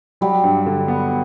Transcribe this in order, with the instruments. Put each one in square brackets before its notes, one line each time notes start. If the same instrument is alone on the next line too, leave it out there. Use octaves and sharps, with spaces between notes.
[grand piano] F#3 [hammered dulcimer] G3
[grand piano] G2
D3
B3